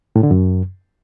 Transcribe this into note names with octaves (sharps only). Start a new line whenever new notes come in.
A2
D3
F#2